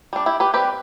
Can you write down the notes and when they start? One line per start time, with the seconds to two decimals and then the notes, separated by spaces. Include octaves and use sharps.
0.13 G3 D4
0.26 E4 G4
0.40 G4 B4
0.54 G3 C4 G4 B4